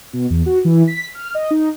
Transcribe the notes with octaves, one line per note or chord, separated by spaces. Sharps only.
B2
E2
F#4
E3
B6
F6
D#5
D#4